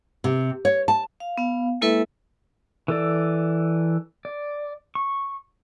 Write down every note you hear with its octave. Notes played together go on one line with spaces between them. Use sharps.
C3
C#5
A5
F5
B3 F5
G#3 A#3 E4 A4 B4 E5
E3 A4 D5
D5
C#6